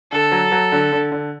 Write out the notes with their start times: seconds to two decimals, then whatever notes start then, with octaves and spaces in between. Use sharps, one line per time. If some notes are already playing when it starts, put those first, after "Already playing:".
0.12 D3 A4
0.32 F#3
0.52 F#3
0.72 D3
0.92 D3
1.12 D3